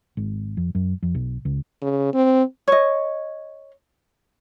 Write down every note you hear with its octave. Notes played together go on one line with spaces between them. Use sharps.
G#1
F2
F#2
F2
B1
C#2
C#3
C4
C#5 D#5